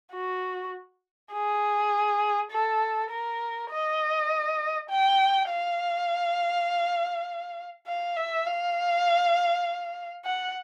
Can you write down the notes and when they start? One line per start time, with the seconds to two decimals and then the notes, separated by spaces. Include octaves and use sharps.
0.14 F#4
1.33 G#4
2.51 A4
3.11 A#4
3.71 D#5
4.89 G5
5.49 F5
7.87 F5
8.17 E5
8.47 F5
10.25 F#5